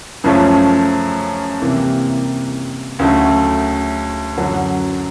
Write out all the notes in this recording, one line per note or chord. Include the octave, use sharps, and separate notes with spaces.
F#2 C#3 F3 A3 C#4
C3 E3 G3 A#3
D2 C#3 F#3 A3
F#2 D3 F#3